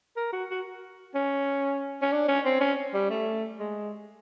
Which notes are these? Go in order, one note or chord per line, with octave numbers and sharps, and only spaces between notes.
A#4
F#4
F#4
C#4
C#4
D4
C#4
C4
C#4
G3
A3
G#3